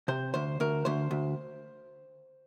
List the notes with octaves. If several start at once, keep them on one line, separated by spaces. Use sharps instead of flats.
C3 C5
D2 C5
D2 A#4
D2 C5
D2